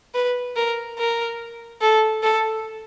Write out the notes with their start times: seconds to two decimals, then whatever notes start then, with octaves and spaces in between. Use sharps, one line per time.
0.14 B4
0.56 A#4
0.98 A#4
1.81 A4
2.23 A4